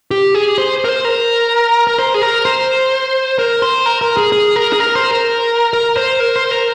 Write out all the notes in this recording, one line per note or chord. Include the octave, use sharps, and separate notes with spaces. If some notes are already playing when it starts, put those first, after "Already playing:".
G4
G#4
C5
A#4
C5
A#4
A#4
C5
G#4
A#4
C5
A#4
C5
A#4
A#4
G#4
G#4
A#4
G#4
A#4
C5
A#4
A#4
C5
A#4
C5
A#4